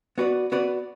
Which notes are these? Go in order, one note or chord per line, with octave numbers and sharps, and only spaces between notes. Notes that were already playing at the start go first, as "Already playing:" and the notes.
B3 F#4 B4 D5
B3 F#4 B4 D5